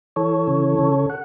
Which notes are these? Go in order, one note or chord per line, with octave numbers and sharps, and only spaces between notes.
E3 A4 C#5
C#3
C#3
F#5